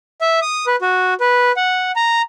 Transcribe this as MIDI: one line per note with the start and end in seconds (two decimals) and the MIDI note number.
0.21 0.40 76
0.42 0.66 87
0.67 0.76 71
0.82 1.14 66
1.20 1.52 71
1.57 1.92 78
1.96 2.22 82